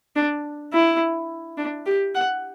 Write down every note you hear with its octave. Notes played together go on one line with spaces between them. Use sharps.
D4
E4
D4
G4
F#5